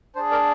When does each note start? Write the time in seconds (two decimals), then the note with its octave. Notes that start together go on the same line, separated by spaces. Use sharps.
0.16 D4 G#4 C5
0.31 A#4 D5